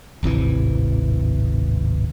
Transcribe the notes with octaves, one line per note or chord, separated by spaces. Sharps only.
D1 G#1 C3 E3